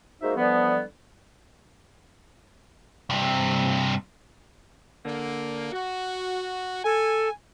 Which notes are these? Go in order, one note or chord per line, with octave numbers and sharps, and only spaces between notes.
G#3 A#3 D#4 F#4 C5 E5
D3 E3 F3 G3 B3
G2 C3
D3 A#3
F#4
A4 G#5